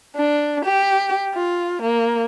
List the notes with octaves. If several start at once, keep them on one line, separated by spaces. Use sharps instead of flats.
D4
G4
F4
A#3